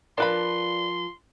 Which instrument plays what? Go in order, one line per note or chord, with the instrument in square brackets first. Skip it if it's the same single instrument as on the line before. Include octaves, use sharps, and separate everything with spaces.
[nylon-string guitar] F3 F4 A#4 [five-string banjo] D4 B4 B5 [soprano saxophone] C6